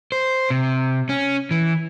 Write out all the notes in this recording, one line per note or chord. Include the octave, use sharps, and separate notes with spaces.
C5
C3
C#4
E3